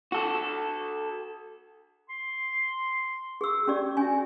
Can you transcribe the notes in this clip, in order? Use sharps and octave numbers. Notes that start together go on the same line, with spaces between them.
F#4 A4
C6
G#4 E6
C#4 G4 D5
C#4 F#4 G#5